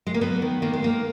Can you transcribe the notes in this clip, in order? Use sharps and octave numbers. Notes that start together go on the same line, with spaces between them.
G#3
A#3
F#3 B3
D#3
D#3 A#3
G#3
D#3 A#3